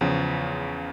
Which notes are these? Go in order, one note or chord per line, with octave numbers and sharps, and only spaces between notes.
E2 C#3 F3